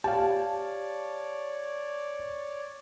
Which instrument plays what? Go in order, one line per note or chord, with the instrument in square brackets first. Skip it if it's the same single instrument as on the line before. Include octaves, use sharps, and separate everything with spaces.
[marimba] G4 [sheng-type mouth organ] C#5 D5 [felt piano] F5 A5